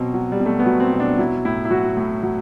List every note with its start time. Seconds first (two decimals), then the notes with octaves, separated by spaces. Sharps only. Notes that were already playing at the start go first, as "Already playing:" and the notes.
Already playing: B2 F#3 C4
0.14 F#3
0.32 G3
0.40 B2
0.46 A3
0.59 B3
0.66 F#3
0.80 C4
0.93 B2
1.00 D4
1.18 F#3 E4
1.45 A2 E4
1.65 E4
1.70 F#3 F#4
1.97 A2
2.23 F#3